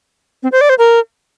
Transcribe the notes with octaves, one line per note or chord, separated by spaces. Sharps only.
C4
C5
D5
C5
A#4